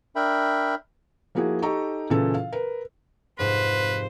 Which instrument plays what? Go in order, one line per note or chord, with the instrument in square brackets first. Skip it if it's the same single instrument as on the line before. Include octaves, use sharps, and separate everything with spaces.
[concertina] D4 A#4 E5 G5 B5
[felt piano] F3 A#3 E4 F#4 G#4
D#4 G4 A4 A#5 C#6
A#2 C#3 E3 C#4 E4 A4
F5
A#4 B4
[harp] F1 G#2 [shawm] B4 [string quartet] C5